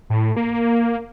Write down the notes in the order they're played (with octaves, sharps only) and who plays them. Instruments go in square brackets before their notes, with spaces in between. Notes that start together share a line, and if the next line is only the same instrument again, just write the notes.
[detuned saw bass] A2
A#3